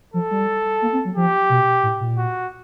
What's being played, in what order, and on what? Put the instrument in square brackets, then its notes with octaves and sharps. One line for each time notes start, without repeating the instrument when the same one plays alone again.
[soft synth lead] F3 [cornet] A4
[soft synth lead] G3
A#3
C4
F#3
[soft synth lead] F3 [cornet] G4
[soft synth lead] B2
A2
A#2
[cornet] F#4